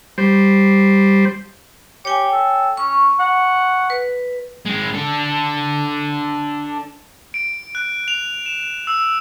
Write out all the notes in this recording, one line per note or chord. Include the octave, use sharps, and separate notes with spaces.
G3 C5
G4 C#5 G5 G#5
A4
C#4 C#6
F#5
B4
G#3 C4
D4 A4
D7
F#6
F7
E7
E6